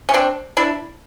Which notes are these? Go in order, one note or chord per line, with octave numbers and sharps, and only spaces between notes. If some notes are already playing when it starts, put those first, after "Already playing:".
C#4
C4 D4
D4 E4